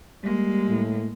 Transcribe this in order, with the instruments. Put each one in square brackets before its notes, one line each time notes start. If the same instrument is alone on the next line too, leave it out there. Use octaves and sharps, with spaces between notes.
[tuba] G3 [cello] G#3 A#3
[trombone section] A2